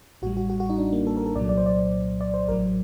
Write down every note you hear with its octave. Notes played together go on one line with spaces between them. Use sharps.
A1 A2 G3 F#4
F#4
F#4
F#4
D#4
D4
A#3
A4
A#4
A4
C2 A#2 F#3 D5
D5
C5
D5
D5
C5
A1 A2 F#3 A#4